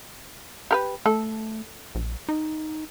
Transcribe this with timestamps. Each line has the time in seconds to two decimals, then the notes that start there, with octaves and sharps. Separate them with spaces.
0.71 G4 A#4 B4
1.06 A3 A4
1.95 A#1
2.29 D#4